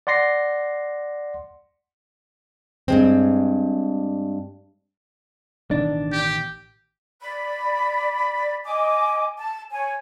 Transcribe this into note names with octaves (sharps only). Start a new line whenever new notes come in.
D5 F#5 C6 A#6 C7
G2 G#3 C4
A1 B2 D#3 D4
G4
D5 B5
D#5 G#5 D6
A5
C#5 G#5